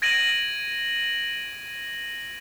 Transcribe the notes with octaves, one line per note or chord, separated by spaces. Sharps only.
G#6 A#6 D7 D#7 F#7